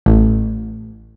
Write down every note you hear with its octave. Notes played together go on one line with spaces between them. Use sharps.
A1